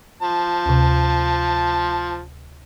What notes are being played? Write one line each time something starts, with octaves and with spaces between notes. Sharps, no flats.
F3 A5
D2 C3